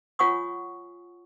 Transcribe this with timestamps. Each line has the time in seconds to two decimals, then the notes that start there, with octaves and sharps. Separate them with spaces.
0.19 F4 C#5 F#5 G#5 C#6 D#6